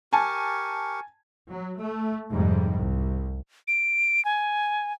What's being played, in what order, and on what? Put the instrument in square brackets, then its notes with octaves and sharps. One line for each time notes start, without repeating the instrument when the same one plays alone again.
[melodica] G4 A#4 C#6 [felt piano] G#5 A5
[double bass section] F#3
A3
F1 F2 G#2 G3
C2
[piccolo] D7
G#5